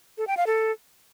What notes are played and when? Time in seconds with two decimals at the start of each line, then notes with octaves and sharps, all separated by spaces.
0.18 A4
0.27 G5
0.37 F5
0.47 A4